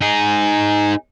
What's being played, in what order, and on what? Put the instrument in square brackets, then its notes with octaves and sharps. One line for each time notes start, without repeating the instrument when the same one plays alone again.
[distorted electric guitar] D#4 G#4